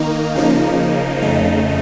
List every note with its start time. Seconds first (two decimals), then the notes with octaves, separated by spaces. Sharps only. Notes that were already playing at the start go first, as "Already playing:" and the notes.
Already playing: D#3 A#3 D#4
0.35 C#3 F3 A#3 D#4
1.22 F2 C#3 A3 D#4